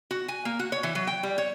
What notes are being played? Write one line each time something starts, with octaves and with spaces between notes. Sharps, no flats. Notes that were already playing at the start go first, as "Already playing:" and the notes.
F#4
G#5
A#3
F#4
C#5
E3
F#3
G5
G3
C#5